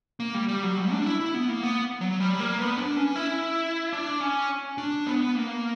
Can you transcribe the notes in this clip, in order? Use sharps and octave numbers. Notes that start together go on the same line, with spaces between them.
A#3
G3
G3
F#3
G3
D4
E4
E4
B3
A#3
B3
F#3
G3
A#3
B3
D4
C#4
E4
D4
C#4
D4
B3
A#3